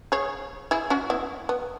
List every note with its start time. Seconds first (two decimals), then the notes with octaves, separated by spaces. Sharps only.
0.12 G#4 C#5
0.71 E4 G#4
0.90 C#4 F#4
1.10 B3 E4
1.49 B3